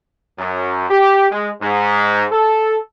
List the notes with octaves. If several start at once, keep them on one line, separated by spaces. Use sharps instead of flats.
F#2
G4
G#3
G#2
A4